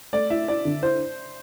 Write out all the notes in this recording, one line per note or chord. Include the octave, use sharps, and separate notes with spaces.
A3 D5
E4 E5
E4 D5
D3
E4 C5